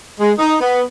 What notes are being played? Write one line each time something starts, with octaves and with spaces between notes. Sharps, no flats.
G#3
D#4
B3